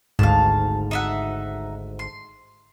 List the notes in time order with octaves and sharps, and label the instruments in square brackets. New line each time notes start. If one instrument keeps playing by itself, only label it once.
[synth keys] G#1 D2 G#2 [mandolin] F5 A5
[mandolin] D#4 E5 F#5
C6